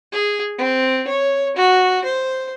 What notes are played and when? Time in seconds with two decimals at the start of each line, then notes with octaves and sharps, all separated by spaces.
0.12 G#4
0.58 C4
1.08 C#5
1.56 F#4
2.04 C5